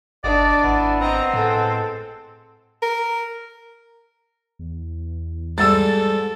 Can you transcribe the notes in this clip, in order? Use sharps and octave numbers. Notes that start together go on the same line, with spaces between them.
G1 D4 D5 D#5
G#1 B3 E4
C4 D#5 A#5
A2 G#3 A4
A#4
E2
G#2 G3 A4 E6 A6